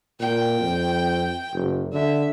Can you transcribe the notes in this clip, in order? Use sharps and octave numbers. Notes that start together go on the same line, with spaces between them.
A#2 G5
F2
F#1
D3 E5